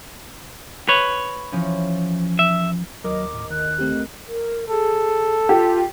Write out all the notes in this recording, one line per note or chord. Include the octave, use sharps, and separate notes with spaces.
B4 C#5
E3 F3 C#4
E5
D#2 F#3 A#4 D#5 D6
A2
D#3 F#6
A3 C4 G4
A#4
G#4 A4
F4 G4